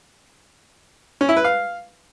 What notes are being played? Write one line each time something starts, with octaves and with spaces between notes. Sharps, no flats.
C#4
E4
B4
F5